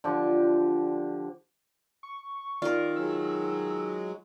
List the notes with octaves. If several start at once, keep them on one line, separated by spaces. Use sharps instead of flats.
D3 F3 G4
C#6
D#3 F4 A#4 D5
F#3 G#3 E6